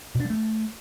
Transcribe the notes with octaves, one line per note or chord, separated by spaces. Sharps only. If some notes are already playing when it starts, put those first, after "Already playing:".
B2
D4
G3
A3